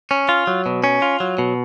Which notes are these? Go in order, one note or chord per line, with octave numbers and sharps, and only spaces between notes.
C#4
F4
F#3
B2
C#4
F4
F#3
B2